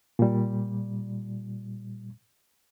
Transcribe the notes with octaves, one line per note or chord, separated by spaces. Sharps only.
A#2 G3